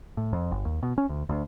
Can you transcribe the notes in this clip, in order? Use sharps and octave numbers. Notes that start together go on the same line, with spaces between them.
A2
F2
G1
D#2
B2
C#4
D2
D2